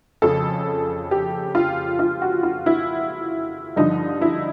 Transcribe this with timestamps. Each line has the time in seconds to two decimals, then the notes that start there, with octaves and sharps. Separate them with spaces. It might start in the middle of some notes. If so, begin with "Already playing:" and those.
0.22 F2 C#3 F3 A4
1.11 G4
1.55 F4
1.99 F4
2.22 F#4
2.43 F4
2.66 E4
3.76 G2 D3 F3 D#4
4.22 E4